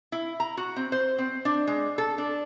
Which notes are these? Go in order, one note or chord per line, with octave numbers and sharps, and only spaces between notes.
E4
A#5
F#4
C4
C5
C4
D4
G#3
A4
D4